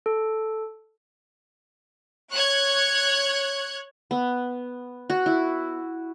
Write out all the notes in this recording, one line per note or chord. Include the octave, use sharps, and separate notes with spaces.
A4
C#5 C#6 F#6 G#6
B3
F#4
E4